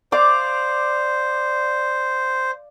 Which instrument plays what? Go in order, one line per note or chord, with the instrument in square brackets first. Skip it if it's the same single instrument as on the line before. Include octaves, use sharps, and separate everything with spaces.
[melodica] C5 [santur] D5 F5 D6